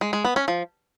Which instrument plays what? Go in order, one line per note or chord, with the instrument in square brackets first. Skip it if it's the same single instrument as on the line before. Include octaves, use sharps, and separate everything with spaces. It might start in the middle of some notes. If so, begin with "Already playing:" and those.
[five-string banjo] G#3
G#3
B3
C#4
F3